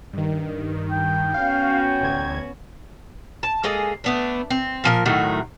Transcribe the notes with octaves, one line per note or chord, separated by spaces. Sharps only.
G2 D#3
G5
B3 C#4 F#4 F5
A1 D2 G#6
A5
G#3 A#3 G#4 A4
A3 B3 D4
C4
A#2 F3 A#4
A2 D#3 F#3 A3